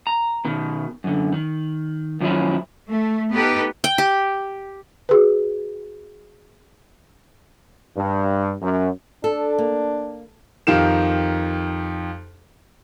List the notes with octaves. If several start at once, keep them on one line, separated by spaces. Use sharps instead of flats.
A#5
B2 D#3
F#2 D3
D#3
F#2 D#3 F3 F#3 C#4 E4
A3
B3 D#4 G4 A4 B4
G5
G4
F#4 G#4 B4
G2
F#2
D4 A4
A#3
F2 D#3 F4 G4 A#4 E7